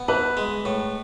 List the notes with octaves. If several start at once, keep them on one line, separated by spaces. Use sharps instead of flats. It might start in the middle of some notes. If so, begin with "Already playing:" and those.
Already playing: B3
E3 B4
G#3
A2